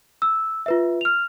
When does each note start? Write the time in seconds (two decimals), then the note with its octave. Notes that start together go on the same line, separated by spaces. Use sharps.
0.22 E6
0.66 F4 B4 E5
1.01 F6 F7